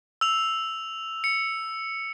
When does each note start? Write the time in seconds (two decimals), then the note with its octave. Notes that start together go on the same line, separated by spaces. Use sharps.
0.21 E6 F7
1.24 C#7